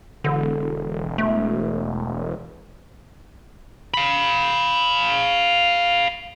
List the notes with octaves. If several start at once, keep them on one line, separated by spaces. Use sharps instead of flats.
E1 D3
A3
F5 B5